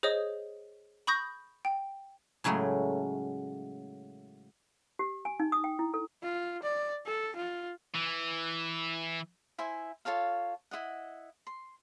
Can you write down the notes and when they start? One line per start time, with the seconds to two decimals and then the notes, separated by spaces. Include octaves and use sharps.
0.03 G#4 C5 C#5 D#5 D#6
1.07 B5 C#6 D#6 G6 A#6
1.65 G5
2.44 A2 C#3 F#3 G#3 A3
4.99 G4
5.25 G#5
5.40 D#4
5.52 D#6
5.64 G5
5.79 E4
5.94 A4
6.23 F4
6.63 D5
7.06 A4
7.36 F4
7.95 E3
9.58 E4 C5 E5 G#5
10.05 F4 A4 C#5 F5
10.71 E4 F4 D#5 F#5
11.47 C6